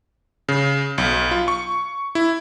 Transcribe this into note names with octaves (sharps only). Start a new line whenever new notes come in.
C#3
B1
F4
C#6
E4